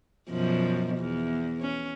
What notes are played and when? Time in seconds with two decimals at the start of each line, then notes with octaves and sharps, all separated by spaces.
0.30 F#2 B2 F3
0.97 E2
1.61 C#4